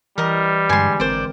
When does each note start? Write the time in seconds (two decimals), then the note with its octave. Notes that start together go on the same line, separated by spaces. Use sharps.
0.18 E3 G3 A#4 D#5
0.69 G2 D3 G#3 G#5 C6
1.00 G#1 C4 A#4 C5 D5